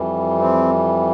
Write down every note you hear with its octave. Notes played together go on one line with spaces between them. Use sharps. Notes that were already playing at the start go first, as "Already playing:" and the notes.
Already playing: F2 E3 G3
C4